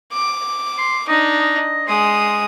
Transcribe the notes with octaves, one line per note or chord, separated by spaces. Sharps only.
D6
C6
D4 D#4 D#5
D#5
G#3 C6 D#6